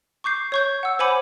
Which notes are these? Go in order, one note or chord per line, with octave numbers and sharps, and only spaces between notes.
C#6 D6 G6 C7
C#5 C#6 G6
F#5 E6
C5 C#5 F#5 G#5 B5 D6